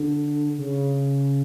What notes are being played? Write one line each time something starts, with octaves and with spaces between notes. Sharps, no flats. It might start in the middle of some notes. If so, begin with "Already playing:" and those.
Already playing: D3
C#3